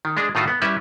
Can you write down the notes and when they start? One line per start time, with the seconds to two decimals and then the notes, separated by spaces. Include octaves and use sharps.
0.05 D#3
0.17 G#3 D4 G#4
0.35 A2 D#3 A3 F4 F#4
0.47 B3
0.62 G3 C#4 E4 B4 E5